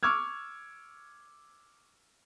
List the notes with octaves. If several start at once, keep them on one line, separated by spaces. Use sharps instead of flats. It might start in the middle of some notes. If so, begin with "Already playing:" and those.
C#6 D6 E6 F6 G#6